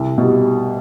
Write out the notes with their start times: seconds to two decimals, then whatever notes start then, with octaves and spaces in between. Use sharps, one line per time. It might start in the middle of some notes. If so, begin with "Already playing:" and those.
Already playing: C2
0.18 B2 G3